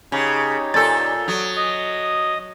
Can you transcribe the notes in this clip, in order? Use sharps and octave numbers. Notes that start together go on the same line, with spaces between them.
C#3 D#4 G4 C#5
A#2 A4 A6
F#3 D#6
D#5 D#6